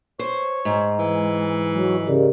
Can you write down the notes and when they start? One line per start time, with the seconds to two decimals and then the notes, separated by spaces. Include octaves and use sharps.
0.19 C5 C#5
0.65 G#2
0.99 E3 G#3
1.72 F#3
2.07 C#3 G4 A#4 D5